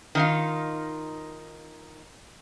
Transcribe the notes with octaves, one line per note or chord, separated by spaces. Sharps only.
D#3 D#4 F4